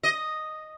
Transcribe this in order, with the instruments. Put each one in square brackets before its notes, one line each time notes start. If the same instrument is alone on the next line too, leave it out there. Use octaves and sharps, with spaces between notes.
[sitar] D#5